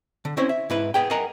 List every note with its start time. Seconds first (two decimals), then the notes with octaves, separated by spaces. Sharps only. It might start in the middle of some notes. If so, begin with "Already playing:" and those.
0.25 D3
0.37 C4 C#4 E4 C5 C#5
0.49 E5
0.70 G#2 E4 B4
0.94 B3 G#4 G5
1.11 A#4 D#5 F#5 G#5 A#5